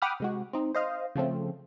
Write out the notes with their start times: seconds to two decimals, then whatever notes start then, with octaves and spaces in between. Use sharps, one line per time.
0.02 F#5 G5 B5 D6 D#6 F6
0.20 C3 G#3 F#4
0.53 C4 D#4
0.75 C5 D#5 F5
1.15 C#3 F3 A3 C4